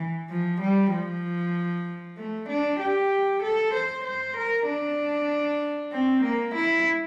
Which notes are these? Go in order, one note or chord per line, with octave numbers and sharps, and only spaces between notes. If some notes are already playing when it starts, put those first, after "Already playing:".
Already playing: E3
F3
G3
F3
A3
D4
G4
A4
C5
C5
A#4
D4
C4
A#3
E4